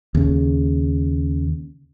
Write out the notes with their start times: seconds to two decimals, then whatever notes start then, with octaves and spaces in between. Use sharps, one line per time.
0.15 D#2 C#3